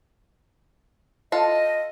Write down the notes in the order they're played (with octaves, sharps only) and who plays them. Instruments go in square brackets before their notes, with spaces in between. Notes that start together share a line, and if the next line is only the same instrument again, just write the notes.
[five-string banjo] F4 A4 [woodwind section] D#5